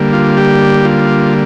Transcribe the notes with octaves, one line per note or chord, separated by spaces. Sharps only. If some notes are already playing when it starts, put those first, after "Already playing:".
Already playing: D3 G3 A#3
F4
G4
F4